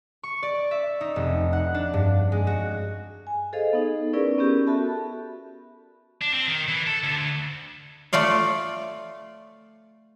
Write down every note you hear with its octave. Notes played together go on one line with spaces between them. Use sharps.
C#6
D5
E5
D#4
F1
F#5
D4
G2
G#3
F#4
G#5
G#4 A4 C5 D#5 F5
B3 D#4
C#4 E4 G#4 A#4 B4 D5
B3 C#4 G4 A#4
F#4 A4 E5 A5 B5
D4
C4
D#3
E3
A4
D2
A3 F4 D5 F5